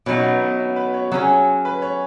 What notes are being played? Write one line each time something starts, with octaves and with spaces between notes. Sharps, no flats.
B2 F#3 C#4 D#4 F#4
B3
B3
C#4
B4
C#5
F#3 C#4 G#4
B4
C#5